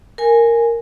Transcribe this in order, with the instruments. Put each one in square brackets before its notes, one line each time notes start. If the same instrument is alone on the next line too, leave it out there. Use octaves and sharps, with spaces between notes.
[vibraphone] A#4 G#5